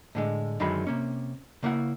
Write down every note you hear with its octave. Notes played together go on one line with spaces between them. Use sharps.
A2 D3 G#3
F#2 D3 D#3 F#3 G#3 B5
C3 A#3 C#4
C#3 A#3 E4 F#5